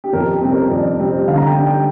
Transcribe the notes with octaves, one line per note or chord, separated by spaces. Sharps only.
G4
F2 A#4
G4
C3 G3 C4
A#4
F2 D5
C3 G3 C4
D3 F5
A#5
G5
G3 D4
G5